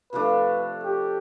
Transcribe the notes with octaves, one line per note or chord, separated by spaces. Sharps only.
C3 F3 A3 D4 B4
G4